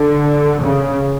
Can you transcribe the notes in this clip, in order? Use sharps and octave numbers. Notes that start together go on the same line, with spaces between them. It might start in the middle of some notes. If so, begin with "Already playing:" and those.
Already playing: D3
C#3